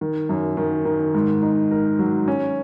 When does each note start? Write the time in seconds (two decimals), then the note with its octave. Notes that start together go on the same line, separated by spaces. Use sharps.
0.01 D#3
0.29 F#2
0.57 D#3
0.85 D#3
1.15 G#2
1.42 D#4
1.71 A#4
1.99 F#3
2.28 C#4